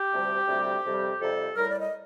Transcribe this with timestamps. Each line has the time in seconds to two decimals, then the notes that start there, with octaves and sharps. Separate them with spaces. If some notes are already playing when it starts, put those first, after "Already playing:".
Already playing: G4
0.12 D2 C3 G3
0.47 D2 C3 G3
0.84 F2 C3 G3
1.20 F2 C3 G3 A4
1.56 A2 G3 A#4
1.69 D5
1.80 D#5